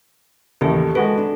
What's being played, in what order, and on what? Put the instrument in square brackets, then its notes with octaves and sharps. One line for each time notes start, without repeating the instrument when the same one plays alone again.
[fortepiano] A1 D#2 [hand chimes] G4 A4
[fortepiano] G#3 F#4 B4 [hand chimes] A4
[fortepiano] D4